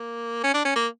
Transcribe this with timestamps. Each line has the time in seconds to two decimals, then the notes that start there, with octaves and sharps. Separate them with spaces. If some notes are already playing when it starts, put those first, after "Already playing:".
Already playing: A#3
0.43 C#4
0.54 D4
0.65 C#4
0.75 A#3